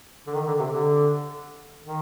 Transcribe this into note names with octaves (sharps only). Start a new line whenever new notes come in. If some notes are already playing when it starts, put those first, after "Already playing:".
D3
D#3
D3
C3
D3
D#3